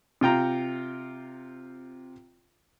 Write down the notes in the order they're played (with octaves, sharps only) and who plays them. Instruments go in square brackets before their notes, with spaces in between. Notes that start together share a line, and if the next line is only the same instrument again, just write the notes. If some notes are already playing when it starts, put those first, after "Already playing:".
[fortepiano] C3 F4 G5 A#5